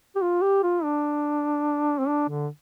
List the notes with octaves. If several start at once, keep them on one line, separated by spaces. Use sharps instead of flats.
G4
F4
G4
F4
D4
C4
D4
D3